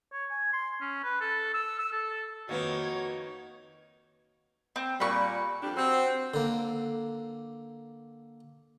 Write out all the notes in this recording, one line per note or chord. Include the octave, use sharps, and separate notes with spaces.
C#5
G#5
C6
C#4
B4
A4
E6
E6
A4
F2 D#3 A#3 B3 D#4 F#4 C#5
C4
A#2 G3 B5 C#6
F2 G3 D4
C4 F#4
D3 A#3